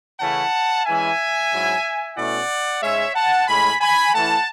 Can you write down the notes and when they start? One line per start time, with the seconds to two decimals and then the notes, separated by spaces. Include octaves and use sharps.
0.21 C#3 E3 A3 C#4 E4 F#5 A5
0.86 E3 G#3 C#4 E4 E5 G#5
1.52 G#2 F#3 C#4 E4
2.17 B2 A3 C#4 E4 D5 F#5
2.82 G#2 G#3 C#4 C#5 E5
3.15 F#5 A5
3.48 A2 G#3 C#4 G#5 B5
3.81 G#5 B5
4.13 E3 A3 C#4 E4 F#5 A5